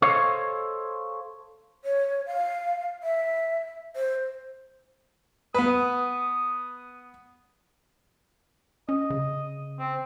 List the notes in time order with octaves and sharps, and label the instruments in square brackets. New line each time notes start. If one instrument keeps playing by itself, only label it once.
[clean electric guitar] A4 C5 C#5 D#5 F5
[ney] C#5
F5
E5
C5
[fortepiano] B3 B4 [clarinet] D#6
[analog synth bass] C#4 [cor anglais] D#5
[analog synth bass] C#3
[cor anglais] C4